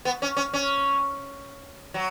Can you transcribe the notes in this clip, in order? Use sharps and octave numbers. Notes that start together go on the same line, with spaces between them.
B3
C#4
C#4
C#4
F#3